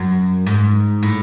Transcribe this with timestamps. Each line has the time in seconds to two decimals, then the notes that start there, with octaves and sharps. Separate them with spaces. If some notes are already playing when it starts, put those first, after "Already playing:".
Already playing: F#2
0.46 G#2
1.03 A2